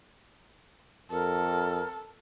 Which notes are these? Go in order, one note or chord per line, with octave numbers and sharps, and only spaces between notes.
F2 A4 A#4